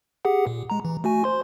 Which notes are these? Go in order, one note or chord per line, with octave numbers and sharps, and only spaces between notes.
G4 G#4 F#5
A#2
G#3 A#5
E3
A3 F#4 G#5
C5 C6